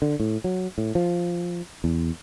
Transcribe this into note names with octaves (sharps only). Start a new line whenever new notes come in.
D3
A2
F#3
A2
F3
E2